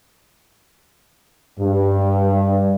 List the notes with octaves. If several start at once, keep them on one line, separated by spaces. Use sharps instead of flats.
G2